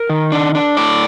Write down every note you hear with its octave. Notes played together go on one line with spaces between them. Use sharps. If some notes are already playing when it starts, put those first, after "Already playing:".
Already playing: A#4
D#3
D4
D4
A2 D5